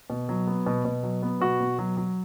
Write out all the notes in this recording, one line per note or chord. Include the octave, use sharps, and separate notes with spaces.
B2
F#3
B3
B2
B2
F#3
B3
B2 F#4
B2
F#3
F#3